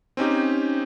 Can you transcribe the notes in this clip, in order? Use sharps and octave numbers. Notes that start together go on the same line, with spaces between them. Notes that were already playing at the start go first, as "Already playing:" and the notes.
C4 C#4 D#4 G4